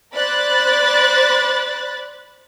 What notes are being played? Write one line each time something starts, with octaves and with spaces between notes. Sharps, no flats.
C5 D5 B5 F#6 A6